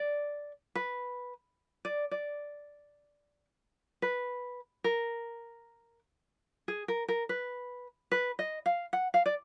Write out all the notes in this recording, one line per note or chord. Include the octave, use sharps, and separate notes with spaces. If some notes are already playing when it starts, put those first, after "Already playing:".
Already playing: D5
B4
D5
D5
B4
A#4
G#4
A#4
A#4
B4
B4
D#5
F5
F#5
F5
D5